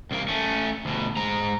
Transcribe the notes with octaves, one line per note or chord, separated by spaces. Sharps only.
C2 A#3
A3 C#4
D2 B2
G#2 A#5